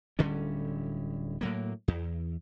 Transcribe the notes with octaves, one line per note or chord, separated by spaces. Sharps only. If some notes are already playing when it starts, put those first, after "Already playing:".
D1 D3 G3 C#4
A2 F#3 A#3
E2